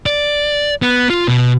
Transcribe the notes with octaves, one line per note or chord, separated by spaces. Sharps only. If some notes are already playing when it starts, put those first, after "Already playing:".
D5
B3
F4
B2